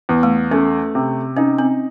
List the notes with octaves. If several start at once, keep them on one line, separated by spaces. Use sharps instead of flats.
E2
A3
A3 C#4
C3
C#4 D#4
C4